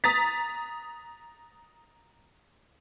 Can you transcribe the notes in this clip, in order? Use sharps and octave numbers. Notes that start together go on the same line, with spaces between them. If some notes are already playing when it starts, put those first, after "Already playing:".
A#5 D#6 A6 B6